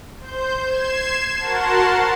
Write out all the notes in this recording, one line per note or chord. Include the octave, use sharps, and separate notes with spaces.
C5 G6
G#6 C7 E7
F#4 A#4 F#5 A5 C6